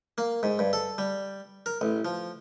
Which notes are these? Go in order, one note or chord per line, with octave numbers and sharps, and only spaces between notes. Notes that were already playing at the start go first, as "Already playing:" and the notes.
A#3
G#2
G2
A4
G3
A#4
A1
F3